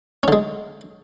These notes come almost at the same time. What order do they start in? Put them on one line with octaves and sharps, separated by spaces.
C#4 D3 G#3